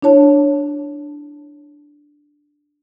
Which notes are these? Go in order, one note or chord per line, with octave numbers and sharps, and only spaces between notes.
D4 E4 C#5 A5